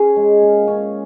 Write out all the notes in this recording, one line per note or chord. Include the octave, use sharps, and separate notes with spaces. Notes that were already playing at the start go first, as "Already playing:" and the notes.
Already playing: C#4 G#4
G#3
A#2
C#4